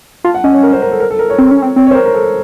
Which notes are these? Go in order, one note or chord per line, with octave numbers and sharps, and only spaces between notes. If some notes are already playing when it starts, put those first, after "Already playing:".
F4 A5
F#5
C#4 D#5
C#5
A#4
C5
A#4
A4
A#4
A4
A#4
C#5
C4
C#4
C4
C4 C#5
C#5
C5
A#4
A#4
A4